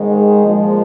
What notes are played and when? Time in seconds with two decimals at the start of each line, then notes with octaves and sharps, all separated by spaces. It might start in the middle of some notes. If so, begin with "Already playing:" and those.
Already playing: G#2 D#3 G#3
0.12 G#4
0.45 A#2 F3 G#3